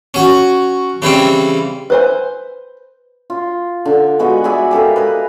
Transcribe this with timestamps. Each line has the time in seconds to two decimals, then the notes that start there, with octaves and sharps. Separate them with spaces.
0.14 C#4 F#4
1.02 C#3 E3 G3 C4
1.90 B4 C5 G#5
3.30 F4
3.85 D3
4.19 G#3 B3 F#4 F#5
4.44 G#4 D5 E5 G#5
4.71 G4 A4 A#4 F5
4.96 B4 D#5 G#5